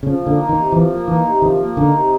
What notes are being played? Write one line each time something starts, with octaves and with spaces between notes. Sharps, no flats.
C#3 F3
A#3
D3
D#4
D#3
C3
E3 F3
A#3
E3 D#4
C3
D#3 F3
A#3
D3 D#4
C3